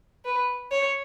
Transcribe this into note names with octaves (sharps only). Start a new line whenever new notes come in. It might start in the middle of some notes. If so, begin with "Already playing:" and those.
B4
C#5